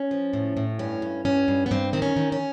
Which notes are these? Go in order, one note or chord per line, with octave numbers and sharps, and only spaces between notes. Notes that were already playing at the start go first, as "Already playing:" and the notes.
Already playing: C#4
F3
A2
A2
G2 C#4
G2
G2 C#4
G2
B3
G2 C4
D#3 C4
C#4
D#3
C#4